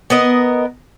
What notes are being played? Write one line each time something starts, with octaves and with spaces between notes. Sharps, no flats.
B3 A#4 D#5